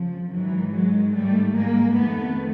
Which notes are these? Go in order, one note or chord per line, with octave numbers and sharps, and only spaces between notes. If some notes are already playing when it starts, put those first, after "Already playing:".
Already playing: F2 C#3 F3
G#2 D#3 E3 F#3
F#3 G#3
G3 A3
G#3 A#3
F2 C3 D#3 A3 B3